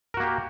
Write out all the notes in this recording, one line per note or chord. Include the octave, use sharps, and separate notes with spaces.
A#3 F#4 G4 A#4